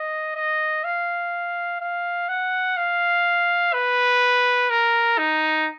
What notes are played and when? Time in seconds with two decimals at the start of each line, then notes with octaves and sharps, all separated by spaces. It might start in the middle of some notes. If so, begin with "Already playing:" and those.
Already playing: D#5
0.36 D#5
0.84 F5
1.81 F5
2.29 F#5
2.77 F5
3.73 B4
4.70 A#4
5.18 D#4